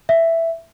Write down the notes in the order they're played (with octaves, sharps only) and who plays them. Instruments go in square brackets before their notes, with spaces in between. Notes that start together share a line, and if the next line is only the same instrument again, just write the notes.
[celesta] E5